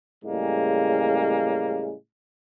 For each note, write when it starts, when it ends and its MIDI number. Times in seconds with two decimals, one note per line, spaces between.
0.24 1.94 45
0.24 1.94 49
0.24 1.94 55
0.24 1.94 56
0.24 1.94 58